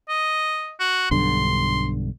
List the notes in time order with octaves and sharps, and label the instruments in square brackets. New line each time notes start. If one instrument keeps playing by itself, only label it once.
[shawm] D#5
F#4
[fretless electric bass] B1 G2 D3 [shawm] C6